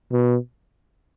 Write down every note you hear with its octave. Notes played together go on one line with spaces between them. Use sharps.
B2